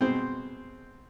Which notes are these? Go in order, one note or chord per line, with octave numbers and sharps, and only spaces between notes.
B2 G#3 C4 C5